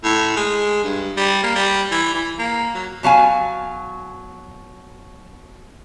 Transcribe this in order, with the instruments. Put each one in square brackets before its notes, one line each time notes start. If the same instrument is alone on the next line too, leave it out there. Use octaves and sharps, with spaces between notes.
[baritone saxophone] A2
G#3
G2
G3
A#3
G3
E3
E3
A#3
F#3
[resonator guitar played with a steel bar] B2 F#3 F5 G#5